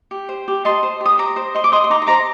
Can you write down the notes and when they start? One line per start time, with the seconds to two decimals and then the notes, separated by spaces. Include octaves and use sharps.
0.11 G4
0.29 C5
0.48 G4
0.65 D#5 A5 C6
0.83 C5
1.01 G4
1.06 D#6
1.18 C5 A#5 D6
1.36 C5
1.55 D#5 C6
1.64 D6
1.72 D#5 C6 D#6
1.84 C6
1.90 D#4 A#5 D6
2.02 C6
2.07 C5 A#5 D6